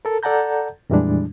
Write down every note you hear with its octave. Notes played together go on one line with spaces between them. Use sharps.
A4 A#4
A4 D5 F#5 A5 A#5 G6
F2 A#2 E3 G3 G#3 D4